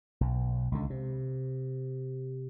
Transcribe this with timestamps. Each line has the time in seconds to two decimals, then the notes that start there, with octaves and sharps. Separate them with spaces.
0.21 B1
0.72 C#2 D3
0.90 C3